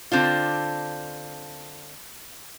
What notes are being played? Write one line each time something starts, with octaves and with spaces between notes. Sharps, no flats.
D3 C4 D4 F4